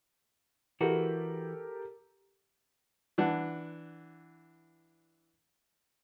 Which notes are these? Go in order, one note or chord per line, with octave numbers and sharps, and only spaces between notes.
E3 F#4 G4 A4 A#4
E3 D4 F#5